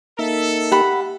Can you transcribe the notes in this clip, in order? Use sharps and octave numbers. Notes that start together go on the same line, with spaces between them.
A#3 D#4 A4 E5
G4 F#5 B5